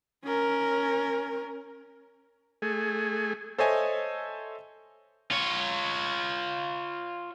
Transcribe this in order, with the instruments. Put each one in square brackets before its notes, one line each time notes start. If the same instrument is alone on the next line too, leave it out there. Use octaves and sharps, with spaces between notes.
[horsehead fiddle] C#4 A#4
[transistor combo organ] A3 G#4
[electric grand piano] A4 C5 C#5 D#5 E5 G#5
[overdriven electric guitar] F4 C#5